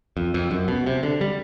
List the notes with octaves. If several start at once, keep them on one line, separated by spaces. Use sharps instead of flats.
F2
F2
F#2
B2
C3
D3
G3